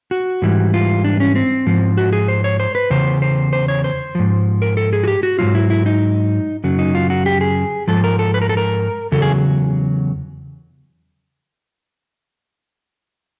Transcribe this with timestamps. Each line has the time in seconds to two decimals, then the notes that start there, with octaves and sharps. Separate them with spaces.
0.11 F#4
0.42 G#2 E3 G3
0.74 F4
1.04 D4
1.20 C#4
1.35 C4
1.66 G#2 F3
1.97 F#4
2.13 G#4
2.28 C5
2.44 C#5
2.60 C5
2.75 B4
2.90 E2 C#3 C5
3.22 C5
3.53 C5
3.68 C#5
3.84 C5
4.15 G#2 F3
4.62 A#4
4.77 A4
4.93 G#4
5.04 F#4
5.08 G4
5.23 F#4
5.39 G#2 D#3 F#3 F4
5.55 E4
5.70 E4
5.86 D#4
6.64 F#2 C#3 F#3
6.79 D#4
6.95 F4
7.10 F#4
7.26 G4
7.41 G#4
7.88 G#2 F3 A4
8.04 A#4
8.19 A4
8.34 B4
8.42 A#4
8.49 A4
8.57 A#4
9.12 E2 C#3 F#3 A4
9.22 G#4